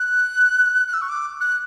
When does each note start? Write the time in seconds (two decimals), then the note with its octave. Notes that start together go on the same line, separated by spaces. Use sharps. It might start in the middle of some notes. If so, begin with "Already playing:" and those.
Already playing: F#6
0.88 F#6
0.93 E6
1.02 C#6
1.09 D6
1.41 F#6